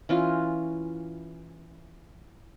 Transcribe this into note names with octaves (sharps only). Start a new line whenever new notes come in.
E3 C#4 F4